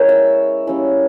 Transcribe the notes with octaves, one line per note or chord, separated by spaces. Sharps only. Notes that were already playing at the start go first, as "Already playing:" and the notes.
Already playing: G#3 C#4 E4 A#4 C#5
E5
G3 A#3 C#4 E4